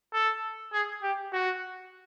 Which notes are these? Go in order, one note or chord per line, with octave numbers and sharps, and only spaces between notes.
A4
G#4
G4
F#4